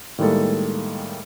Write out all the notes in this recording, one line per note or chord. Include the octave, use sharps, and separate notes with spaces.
A2 D#3 G3 G#3 A#3 A4